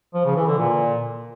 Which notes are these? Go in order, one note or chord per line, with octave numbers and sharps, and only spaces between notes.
F3
C#3
E3
D3
A#2